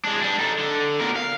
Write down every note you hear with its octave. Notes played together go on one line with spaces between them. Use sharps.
G#3 D4
G3 D4
D#4 A4
D3
B2 A#4
F5